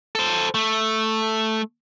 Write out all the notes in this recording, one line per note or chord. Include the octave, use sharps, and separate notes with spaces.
A4 C5
A3